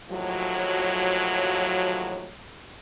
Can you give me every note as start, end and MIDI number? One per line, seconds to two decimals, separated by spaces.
0.10 2.30 39
0.10 2.30 45
0.10 2.30 53
0.10 2.30 54